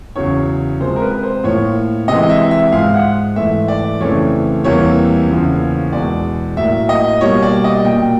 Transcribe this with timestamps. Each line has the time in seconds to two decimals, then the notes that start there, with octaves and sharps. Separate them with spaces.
0.16 E2 C#3 F#3 C#5
0.80 C3 F3 G#3 C5
0.96 A#4
1.02 B4
1.23 C5
1.44 A2 F3 A#3 C#5
2.08 C3 E3 G#3 D#5
2.29 E5
2.51 E5
2.72 G#2 F3 G#3 F5
2.94 F#5
3.36 G#2 E3 A3 E5
3.68 D5
4.01 F2 C#3 E3 A3 C#5
4.64 E2 C3 E3 G3 A#3 C#5
5.29 E2 C#3 F3 A#3
5.92 E2 B2 G#3 D5
6.57 A2 F#3 A#3 E5
6.89 D#5
7.21 B2 G3 A#3 C#5
7.43 D5
7.64 D#5
7.85 A#2 F#3 A#3 G5